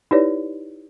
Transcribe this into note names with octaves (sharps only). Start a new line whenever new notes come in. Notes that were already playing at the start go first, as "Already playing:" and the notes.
D#4 E4 G4 B4 C#5 D5